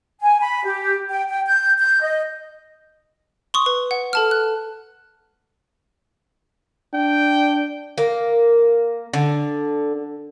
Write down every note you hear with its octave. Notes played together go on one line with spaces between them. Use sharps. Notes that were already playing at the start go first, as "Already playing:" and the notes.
G#5
B5
G4
G5
G5
G6
G6
D#5
C6 C#6 D#6
B4
F#5
A4 A5 F6
F#6
D4 G5
A#3
D3